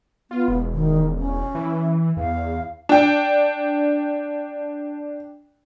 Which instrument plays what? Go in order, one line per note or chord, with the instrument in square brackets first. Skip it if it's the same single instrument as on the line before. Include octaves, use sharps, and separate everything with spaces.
[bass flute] B3 [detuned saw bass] F4
[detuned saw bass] E1
[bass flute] D#3
C#4
[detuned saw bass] E3
[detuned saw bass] E2 [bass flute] F5
[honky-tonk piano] D4 G5